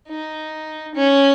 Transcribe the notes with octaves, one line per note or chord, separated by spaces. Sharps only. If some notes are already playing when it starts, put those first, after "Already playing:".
D#4
C#4